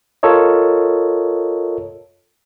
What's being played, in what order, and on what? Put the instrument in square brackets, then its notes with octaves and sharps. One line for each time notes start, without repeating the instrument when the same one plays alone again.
[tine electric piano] F4 A4 A#4 C#5 D#5